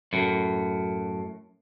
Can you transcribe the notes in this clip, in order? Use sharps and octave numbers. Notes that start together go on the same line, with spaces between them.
F#2 A2